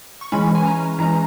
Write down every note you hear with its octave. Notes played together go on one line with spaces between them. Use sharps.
C#6
E3 G#3 C#4 B5
G#5
A#5
E3 G#3 C#4 A#5